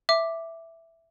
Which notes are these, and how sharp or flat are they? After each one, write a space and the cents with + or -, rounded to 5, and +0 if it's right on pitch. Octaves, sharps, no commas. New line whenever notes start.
E5 +0 D6 +0